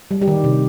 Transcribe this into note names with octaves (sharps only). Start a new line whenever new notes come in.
G3
G3 G4
D#3
C3